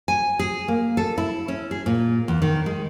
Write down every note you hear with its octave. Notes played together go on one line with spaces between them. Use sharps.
G#5
G#4
A#3
A4
E4
C#4
G#4
A#2
E2
D#3
G#3